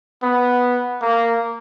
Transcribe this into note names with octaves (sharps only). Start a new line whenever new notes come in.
B3
A#3